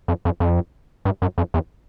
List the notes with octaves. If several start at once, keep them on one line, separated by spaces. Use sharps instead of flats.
F2
F2
F2
G2
F#2
F2
E2